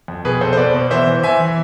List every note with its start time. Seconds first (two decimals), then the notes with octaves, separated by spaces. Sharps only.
0.08 F2
0.25 B2 G#4 B4
0.41 B2 A4 C5
0.53 C5
0.57 B2 B4 D5
0.74 B2
0.91 E3 C5 E5
1.07 E3
1.23 E3 E5 G#5
1.40 E3